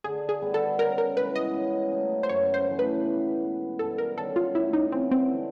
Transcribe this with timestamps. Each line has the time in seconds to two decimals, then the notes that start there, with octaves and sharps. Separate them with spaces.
0.04 D3 G#4
0.29 G#4
0.42 G3 B3
0.54 A4
0.78 C#3 A#4
0.98 A#4
1.17 E3 G#3 B4
1.35 D#5
1.54 C#3
1.92 F#3 A3 C#4
2.23 C5
2.29 F#2 C#5
2.54 C5
2.66 C#3 E3 A3
2.79 B4
3.05 B2
3.43 G#3 B3
3.79 G2 A4
3.98 A#4
4.17 D#3 G#3 C#4 A4
4.36 F4
4.55 A2 E4
4.73 D#4
4.92 E3 G#3 B3 C4
5.11 C4
5.29 D3